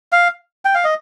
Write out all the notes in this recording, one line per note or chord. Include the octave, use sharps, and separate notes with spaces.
F5
G5
F5
D#5